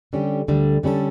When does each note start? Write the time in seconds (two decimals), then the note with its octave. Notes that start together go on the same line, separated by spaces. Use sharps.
0.13 D3 G3 C#4 G4
0.48 D2 D3 G3
0.83 D3 G3 C#4 E4 A4